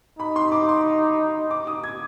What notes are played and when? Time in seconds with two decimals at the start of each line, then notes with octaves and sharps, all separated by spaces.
0.19 D#4 B5
0.36 C6
0.52 D6
0.69 C6
1.51 D6
1.67 D#6
1.84 G#6